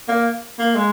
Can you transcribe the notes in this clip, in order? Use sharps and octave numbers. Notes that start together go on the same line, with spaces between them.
A#3
A#3
G#3